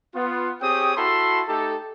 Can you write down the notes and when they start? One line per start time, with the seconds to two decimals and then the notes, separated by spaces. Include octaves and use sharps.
0.15 B3 F4
0.61 C4 G4 G#4 C#5 G5 D#6
0.95 E4 F#4 A4 A5 B5 C6
1.48 A3 D#4 G4 A4